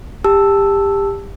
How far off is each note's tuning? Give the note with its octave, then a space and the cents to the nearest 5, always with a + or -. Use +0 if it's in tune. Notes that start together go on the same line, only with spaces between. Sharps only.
G4 +25 A5 +0 E6 +0